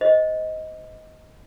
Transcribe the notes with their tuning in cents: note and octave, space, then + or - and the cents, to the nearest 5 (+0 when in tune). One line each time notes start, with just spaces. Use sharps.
C5 -30 D#5 +15